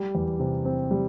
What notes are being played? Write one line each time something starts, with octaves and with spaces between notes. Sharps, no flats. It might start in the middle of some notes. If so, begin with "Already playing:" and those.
Already playing: G3
E2
C3
C4
G3